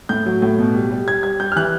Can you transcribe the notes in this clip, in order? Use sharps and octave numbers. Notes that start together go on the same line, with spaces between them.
A2 G6
F#3
A2
B2
G3
G3
G3 G#6
G3 G#6
G3 G6
F6
E3 F#6